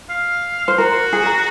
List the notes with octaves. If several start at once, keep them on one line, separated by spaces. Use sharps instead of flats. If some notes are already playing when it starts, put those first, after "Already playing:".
F5
C5
F#4 A#4
G#4
A#4